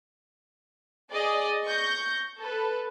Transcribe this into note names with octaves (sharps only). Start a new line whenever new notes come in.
G#4 D5 D#5
C#6 G6 A#6
A4 B4